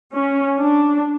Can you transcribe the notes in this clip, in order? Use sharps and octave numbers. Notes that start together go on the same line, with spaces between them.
C#4
D4